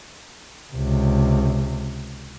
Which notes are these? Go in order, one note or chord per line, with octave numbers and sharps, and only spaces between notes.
C#2 C3